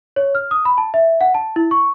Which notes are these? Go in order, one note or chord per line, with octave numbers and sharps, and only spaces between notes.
C#5
F6
D#6
B5
A5
E5
F#5
A5
E4
C#6